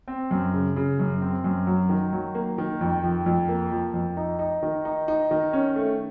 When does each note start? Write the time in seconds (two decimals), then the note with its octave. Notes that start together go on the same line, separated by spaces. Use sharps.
0.08 C4
0.31 F#2
0.54 C#3
0.76 C#3
0.99 F#2
1.22 C4
1.44 F#2
1.67 F#3
1.89 D#3
2.13 F#3
2.35 A#3
2.58 D#3
2.81 F2
3.03 F3
3.26 F2
3.49 A#3
3.71 F3
3.94 F2
4.17 D#4
4.39 D#4
4.63 D#3
4.85 D#4
5.08 D#4
5.31 D#3
5.53 C#4
5.76 A3